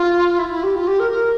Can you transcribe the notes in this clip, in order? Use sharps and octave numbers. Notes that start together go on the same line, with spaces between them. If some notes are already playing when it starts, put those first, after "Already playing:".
Already playing: F4
E4
E4
G4
F4
G4
A#4
A#4